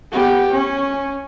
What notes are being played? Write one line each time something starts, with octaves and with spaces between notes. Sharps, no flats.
B3 G4
C#4